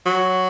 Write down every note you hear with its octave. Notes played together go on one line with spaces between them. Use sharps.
F#3